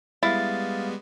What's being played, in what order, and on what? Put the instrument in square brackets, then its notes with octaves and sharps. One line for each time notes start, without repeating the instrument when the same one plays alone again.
[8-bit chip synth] G3 G#3 B3 [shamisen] E4 [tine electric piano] F5 A6